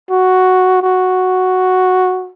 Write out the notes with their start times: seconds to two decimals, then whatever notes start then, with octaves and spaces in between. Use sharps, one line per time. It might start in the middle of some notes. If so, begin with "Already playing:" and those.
0.10 F#4
0.82 F#4